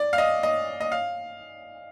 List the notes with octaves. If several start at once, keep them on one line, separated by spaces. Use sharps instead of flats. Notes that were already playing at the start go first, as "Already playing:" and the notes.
Already playing: D5
F5
D#5
D#5
D#5
F5